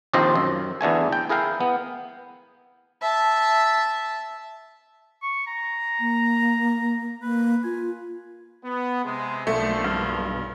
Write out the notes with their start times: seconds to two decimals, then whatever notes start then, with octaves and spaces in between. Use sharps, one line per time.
0.13 A#1 D#2 C4 F4 C5 D#5
0.35 F#2
0.81 E2 D3 A3 G#5
1.12 G5
1.29 E4 G#4 A#4 F5 G5
1.61 B3
3.02 E5 A5
5.23 C#6
5.47 A#5
6.00 A#3
7.22 A#3 B4
7.64 F4 G#5
8.65 B3
9.05 C3 G#3
9.47 B1 D3 F3 A3 A#3
9.84 G2